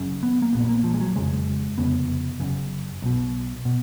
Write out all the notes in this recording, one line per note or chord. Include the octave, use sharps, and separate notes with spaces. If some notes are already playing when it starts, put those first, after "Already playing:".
Already playing: F#1 F#2 C#3
B3
A#3
A#1 A#2 B3
B3
A#3
F3
G#3
F#3
F#1 F2 C#3 G#3
F1 F2 C#3 B3
F#1 F#2 C#3
B1 B2
B2